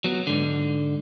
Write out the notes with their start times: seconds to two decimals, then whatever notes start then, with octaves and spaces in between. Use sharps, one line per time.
0.04 F#3 B3
0.27 G#2 D3